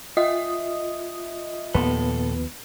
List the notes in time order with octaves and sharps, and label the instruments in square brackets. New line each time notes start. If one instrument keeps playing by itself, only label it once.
[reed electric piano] F4 [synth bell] D#5 E5 D#6
[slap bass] D#2 F3 [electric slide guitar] A#2 A4 [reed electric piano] B3 B4